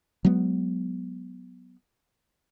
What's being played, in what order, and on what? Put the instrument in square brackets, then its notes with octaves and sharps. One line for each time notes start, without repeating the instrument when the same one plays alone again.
[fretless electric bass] F#3 G#3 B3